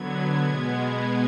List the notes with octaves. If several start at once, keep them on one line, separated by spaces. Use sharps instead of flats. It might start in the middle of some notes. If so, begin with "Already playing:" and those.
Already playing: D3 F#3 B3 G#6
B2 G#3 B3